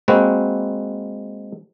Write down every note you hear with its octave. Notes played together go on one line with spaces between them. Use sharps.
G#3 A#3 C4 F#4 B4